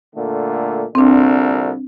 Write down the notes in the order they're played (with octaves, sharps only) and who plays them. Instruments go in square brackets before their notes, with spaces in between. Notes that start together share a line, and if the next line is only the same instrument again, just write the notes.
[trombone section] A#2 D3 A3
[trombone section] C2 A#2 D3 [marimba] C4 D4